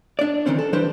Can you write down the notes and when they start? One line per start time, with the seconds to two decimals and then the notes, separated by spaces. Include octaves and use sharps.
0.19 D4 D5
0.46 D#3 E3 C4 C#4 C5
0.59 A4
0.73 E3 G3 D4 B4 C5